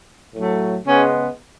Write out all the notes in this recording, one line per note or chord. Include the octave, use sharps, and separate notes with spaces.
A2 F#3 A3
C#3 G#3 B3 C#4